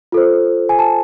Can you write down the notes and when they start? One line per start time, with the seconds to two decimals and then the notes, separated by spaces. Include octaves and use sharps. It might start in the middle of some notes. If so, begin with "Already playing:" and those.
0.12 F4 A4 C5
0.69 G#5
0.79 A5